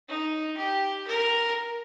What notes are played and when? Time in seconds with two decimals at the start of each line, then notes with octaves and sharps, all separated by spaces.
0.08 D#4
0.58 G4
1.07 A#4